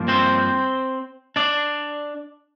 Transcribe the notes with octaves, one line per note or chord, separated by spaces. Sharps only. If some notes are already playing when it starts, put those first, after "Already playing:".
Already playing: G2 F3 A#3
C4 C5
D4 D5